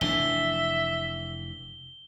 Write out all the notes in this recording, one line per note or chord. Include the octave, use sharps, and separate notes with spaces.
F1 E3 D4 E5 G7